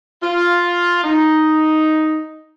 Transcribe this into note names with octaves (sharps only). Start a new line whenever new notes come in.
F4
D#4